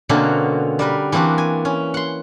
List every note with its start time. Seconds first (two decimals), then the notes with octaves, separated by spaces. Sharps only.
0.09 B2 D3 A#3 C4 C#4 F#4
0.79 G3 A#4 B4
1.12 E3 A#3 C4 D4 F#4
1.38 G#5
1.65 C#4
1.94 F#5 C6